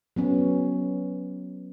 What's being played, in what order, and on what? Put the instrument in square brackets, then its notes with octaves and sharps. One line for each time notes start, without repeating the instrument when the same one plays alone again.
[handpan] F#3 B3 C#4